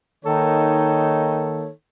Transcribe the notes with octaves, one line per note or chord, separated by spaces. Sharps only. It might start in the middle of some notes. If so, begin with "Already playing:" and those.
D#3 A#3 D#4 A4 C#5